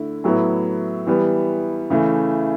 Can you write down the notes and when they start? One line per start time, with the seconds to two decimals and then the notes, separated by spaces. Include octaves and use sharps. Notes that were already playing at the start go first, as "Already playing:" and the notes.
Already playing: D3 A3 E4
0.24 A2 F#3 B3 E4
1.07 E3 G3 B3
1.90 C#3 E3 A3